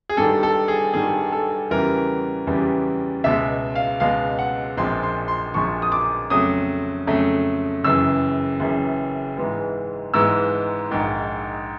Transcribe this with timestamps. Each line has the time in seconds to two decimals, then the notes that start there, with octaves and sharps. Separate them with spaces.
0.09 G#4
0.17 G2 D#3 G3 A4
0.43 A4
0.68 G#4
0.94 G2 D#3 G3 G#4
1.32 A4
1.71 E2 C#3 E3 G3 A#4
2.47 E2 C#3 E3 G3
3.24 C#2 B2 G#3 E5
3.75 F5
4.00 C#2 B2 G#3 F5
4.39 F#5
4.77 A#1 A#2 F3 G#3 C4 C6
5.03 C6
5.28 C6
5.54 A#1 A#2 F3 G#3 C4 C#6
5.82 D#6
5.92 D6
6.30 F2 C#3 F#3 A3 D#6
7.07 F2 C#3 F#3 A3
7.84 F#1 F#2 C#3 E3 E6
8.60 F#1 F#2 C#3 E3
9.37 G#2 E3 G#3 B3
10.14 G#2 E3 G#3 B3 E6
10.91 A#1 G#2 D#3